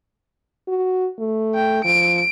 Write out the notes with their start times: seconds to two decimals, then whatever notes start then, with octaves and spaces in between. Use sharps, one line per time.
0.68 F#4
1.19 A3
1.54 G5
1.85 F3 D7